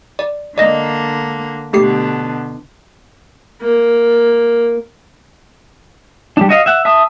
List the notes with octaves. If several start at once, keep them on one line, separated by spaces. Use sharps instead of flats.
D5
D3 A#3 D5 D#5
B2 D3 A3 G4 C7
A#3
G3 D4
F#4 D#5 F5
E5 F#5
E5 A5 D#6